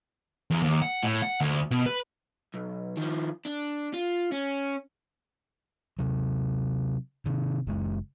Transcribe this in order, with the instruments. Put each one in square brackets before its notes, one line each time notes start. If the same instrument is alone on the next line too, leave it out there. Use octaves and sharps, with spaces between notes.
[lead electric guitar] E2
D#2
F#5
A2
F#5
D2
B2
B4
[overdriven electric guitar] B1
D#3 F3
D4
F4
C#4
[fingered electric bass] C3 F#3
C3 D#3
F#1 G#3